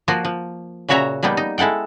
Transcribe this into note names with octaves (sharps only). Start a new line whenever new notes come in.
F3 A#3 F4 F#4
F3
A#2 C#3 F#4 C#5 E5 A#5
F3 G3 A#3 B3 D#4
D#4
G#3 E4 A4 F#5 G5